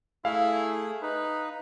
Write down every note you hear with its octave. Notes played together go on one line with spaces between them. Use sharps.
A3 E4 G#4 F5
D#4 B4